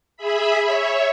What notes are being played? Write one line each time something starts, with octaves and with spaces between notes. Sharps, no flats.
G#4 E5 B5
C#5 E5